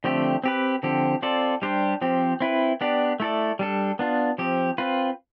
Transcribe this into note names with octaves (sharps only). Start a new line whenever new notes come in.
D3 F3 A3 C4 G4
C4 G4 B4
D3 F3 C4 G4
C4 F4 A4 D5
G3 D4 G4 C5
F3 C4 G4
C4 E4 B4
B3 D4 G4 D5
A3 E4 A4 D5
G3 D4 A4
B3 D4 F4
F3 C4 G4
C4 F4 B4